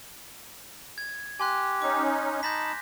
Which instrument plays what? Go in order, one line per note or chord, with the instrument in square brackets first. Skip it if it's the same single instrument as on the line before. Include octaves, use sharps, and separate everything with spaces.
[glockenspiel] G#6
[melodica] G4 [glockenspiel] G#5 C6 F#6
[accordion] C#4 D#4 [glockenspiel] D6
[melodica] D#4 A5 B5 [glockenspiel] G6 A#6 B6